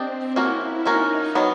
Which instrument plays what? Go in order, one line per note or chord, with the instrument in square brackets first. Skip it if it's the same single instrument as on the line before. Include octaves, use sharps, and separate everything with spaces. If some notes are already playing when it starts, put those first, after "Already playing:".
Already playing: [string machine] C4 [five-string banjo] D4 G4 D#5
[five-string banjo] F3 A#3 C#4 F#4 A#4 [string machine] E4
[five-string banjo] F3 A#3 C#4 F#4 A#4 [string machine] D#4
[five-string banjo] D#3 F#3 B3